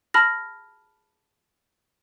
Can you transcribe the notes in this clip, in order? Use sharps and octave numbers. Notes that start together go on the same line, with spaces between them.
A5 B5 F6 A#6